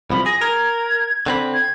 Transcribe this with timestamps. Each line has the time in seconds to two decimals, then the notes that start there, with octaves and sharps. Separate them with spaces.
0.10 C2 F3 B5
0.26 G#4 A#6
0.41 A#4 G#6
1.26 D3 C4 B5
1.54 G#6